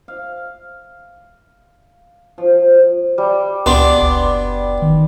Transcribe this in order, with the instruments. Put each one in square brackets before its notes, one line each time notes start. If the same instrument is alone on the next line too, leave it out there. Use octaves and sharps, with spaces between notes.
[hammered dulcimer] F5
F3
[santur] G3
[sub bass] C#2 [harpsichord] B3 D4 [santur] G4 C6 D6
[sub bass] F#1
D#3